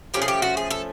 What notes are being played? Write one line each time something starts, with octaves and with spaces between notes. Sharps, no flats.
F3 A3 C#4 G4
G#4
G4
F#4
G#4
A4